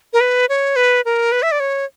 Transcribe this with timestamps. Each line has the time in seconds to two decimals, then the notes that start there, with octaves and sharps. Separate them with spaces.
0.13 A#4
0.20 B4
0.49 C#5
0.76 B4
1.05 A#4
1.32 B4
1.43 E5
1.52 D5
1.60 C#5